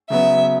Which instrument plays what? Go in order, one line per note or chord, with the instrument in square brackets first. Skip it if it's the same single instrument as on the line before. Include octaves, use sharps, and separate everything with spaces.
[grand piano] C#3 F#3 B3 [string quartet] E5